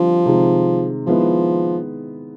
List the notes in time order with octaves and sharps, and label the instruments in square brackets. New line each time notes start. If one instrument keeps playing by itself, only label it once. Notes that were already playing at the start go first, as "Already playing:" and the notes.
Already playing: [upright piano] D3 G3 C4 [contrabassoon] F3
[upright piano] C3 D#3 G#3
[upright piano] D#3 G#3 B3 E4 [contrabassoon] F3